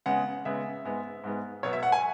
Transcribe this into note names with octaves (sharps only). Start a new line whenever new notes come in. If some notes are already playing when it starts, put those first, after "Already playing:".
C#3 G#3 B3 F#5
C#3 G#3 B3 E5
G#2 G#3 B3
G#2 G#3 B3
B2 F#3 B3 C#5
E5
F#5
G#5